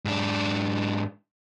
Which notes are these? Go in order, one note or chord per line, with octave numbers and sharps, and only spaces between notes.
G#2 D4